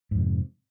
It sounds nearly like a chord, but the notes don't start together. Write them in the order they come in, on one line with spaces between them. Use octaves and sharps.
G#2 F2 C3